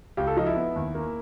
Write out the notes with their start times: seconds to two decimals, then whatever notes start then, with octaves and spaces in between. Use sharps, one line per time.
0.17 C#2 G4
0.27 A4
0.37 F3 D#4
0.46 E4
0.56 B3
0.76 D#2
0.95 A#3